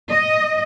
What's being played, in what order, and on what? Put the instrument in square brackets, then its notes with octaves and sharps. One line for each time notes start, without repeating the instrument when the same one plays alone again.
[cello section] D#5